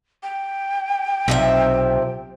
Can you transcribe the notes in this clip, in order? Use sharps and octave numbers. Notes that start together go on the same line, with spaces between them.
G5
B1 C3 F3 E5